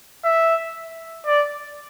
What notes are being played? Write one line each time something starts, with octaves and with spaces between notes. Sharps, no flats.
E5
D5